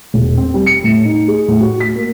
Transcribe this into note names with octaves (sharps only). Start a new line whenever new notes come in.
E1
C4
G3
C#7
A2
D#4
G#4
A2
F#4
B6
A#3